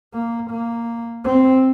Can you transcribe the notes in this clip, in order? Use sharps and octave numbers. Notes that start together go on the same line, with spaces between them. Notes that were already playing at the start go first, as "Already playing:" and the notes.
A#3
A#3
C4